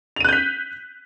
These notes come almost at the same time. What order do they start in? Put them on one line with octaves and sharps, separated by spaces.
F7 D#7 F#6 G6 B6